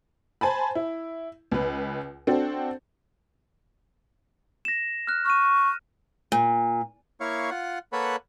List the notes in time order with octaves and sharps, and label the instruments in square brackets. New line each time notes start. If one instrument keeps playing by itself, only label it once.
[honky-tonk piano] C5 G#5 A5 B5
E4
C#2 B4
C4 D4 F#4 A4
[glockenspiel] A#6 E7
F6 F#6
[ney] C#6 [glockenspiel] F6 D#7
[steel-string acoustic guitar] A#2
[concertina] A#3 E4 C#5 F5 C#6
F4 F#5
A#3 A4 B4 C#5 F#5 B5